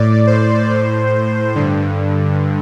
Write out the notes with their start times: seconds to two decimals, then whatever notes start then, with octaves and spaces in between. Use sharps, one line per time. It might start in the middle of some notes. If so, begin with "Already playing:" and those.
Already playing: A2 D5
0.27 C5
0.69 A2
1.55 G2 D3